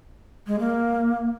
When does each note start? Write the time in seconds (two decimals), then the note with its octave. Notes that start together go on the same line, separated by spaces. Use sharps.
0.47 G#3
0.59 A#3